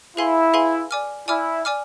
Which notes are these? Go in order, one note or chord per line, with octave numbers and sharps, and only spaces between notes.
E4 G#4 B4 F5 G#5 C6
G#4 B4 F5 G#5 C6
D5 G#5 D6 F6
E4 D5 G#5 D6 F6
D5 G#5 D6 F6